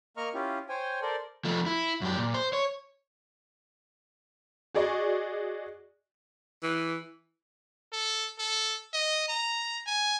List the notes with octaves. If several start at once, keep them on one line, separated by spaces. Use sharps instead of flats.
A#3 A#4 D#5 A#5 C#6 F6
C#4 E4 F4 G4
C5 C#5 G5 G#5
A4 A#4 C5 D5
F3 A3
E4
F#2 G4
A#2
C5
C#5
F#4 G#4 D5 D#5 C#6
E3
A4
A4
D#5
A#5
G#5